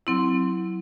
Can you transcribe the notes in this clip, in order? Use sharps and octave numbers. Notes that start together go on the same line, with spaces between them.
F#3 C4 E4